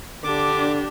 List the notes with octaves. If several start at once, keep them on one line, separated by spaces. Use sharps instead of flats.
D3 D4 G4 D6